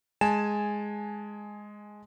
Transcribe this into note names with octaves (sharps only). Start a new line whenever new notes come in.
G#3 G#5 A5 E7